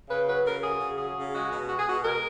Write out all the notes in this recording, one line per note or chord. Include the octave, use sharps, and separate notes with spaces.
C#3 B4
F#3 B4
C#3 A#4
F#3 G#4
C#3
F#3 G#4
C#3
G#3 F#4
B2
G#3 F#4
G#4
B2 F#4
G#3 A#4